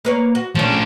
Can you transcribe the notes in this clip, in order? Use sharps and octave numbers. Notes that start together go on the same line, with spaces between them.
A#3 B4 C#5
F#4
F3 A3 C#4 D4